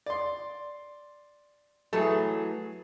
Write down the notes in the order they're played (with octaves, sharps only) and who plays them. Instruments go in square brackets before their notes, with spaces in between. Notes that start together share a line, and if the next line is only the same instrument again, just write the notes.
[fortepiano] D5 C6
[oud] E3 F#3 A3 [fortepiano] G#4 A5